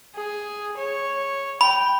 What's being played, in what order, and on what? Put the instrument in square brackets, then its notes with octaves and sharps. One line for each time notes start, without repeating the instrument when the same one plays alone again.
[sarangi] G#4
C#5
[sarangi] G5 [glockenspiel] B5